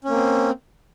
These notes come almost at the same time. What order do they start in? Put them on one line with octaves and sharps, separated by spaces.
C#4 A#3 C4